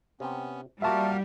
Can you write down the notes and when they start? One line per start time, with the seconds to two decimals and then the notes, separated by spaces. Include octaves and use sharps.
0.20 C3 B3 C#4 G5
0.82 G3 A#3 F4 F#4 A#4 E5 A5